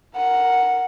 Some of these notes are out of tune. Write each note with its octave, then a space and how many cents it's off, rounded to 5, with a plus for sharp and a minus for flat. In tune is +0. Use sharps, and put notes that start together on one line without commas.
A#4 +0 F#5 +0